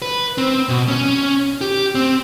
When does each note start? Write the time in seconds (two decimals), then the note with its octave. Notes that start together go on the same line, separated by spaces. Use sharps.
0.02 B4
0.38 C4
0.69 B2
0.88 C#4
1.61 G4
1.95 C4